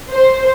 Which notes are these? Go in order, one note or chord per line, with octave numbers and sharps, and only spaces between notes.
C5